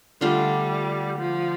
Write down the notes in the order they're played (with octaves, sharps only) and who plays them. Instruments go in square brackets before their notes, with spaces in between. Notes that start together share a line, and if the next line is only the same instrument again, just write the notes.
[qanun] D3 A3 D4 F4 [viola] G3
[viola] F3